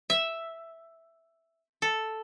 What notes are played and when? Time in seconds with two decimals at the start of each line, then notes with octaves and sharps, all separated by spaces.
0.10 E5
1.82 A4